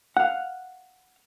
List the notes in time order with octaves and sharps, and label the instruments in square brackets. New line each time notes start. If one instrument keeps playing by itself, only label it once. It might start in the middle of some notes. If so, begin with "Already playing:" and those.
[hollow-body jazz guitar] F5 F#5